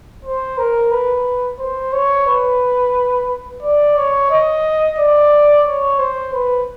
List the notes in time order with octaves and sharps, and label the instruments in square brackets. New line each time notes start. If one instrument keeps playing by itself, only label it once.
[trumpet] C5
A#4
B4
C5
C#5
B4
D5
C#5
D#5
D5
C#5
C5
B4